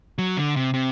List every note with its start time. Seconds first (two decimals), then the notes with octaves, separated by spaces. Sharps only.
0.18 F#3
0.37 D3
0.56 C3
0.74 C3